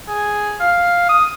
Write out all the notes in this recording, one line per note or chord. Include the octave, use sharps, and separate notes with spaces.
G#4
F5
D#6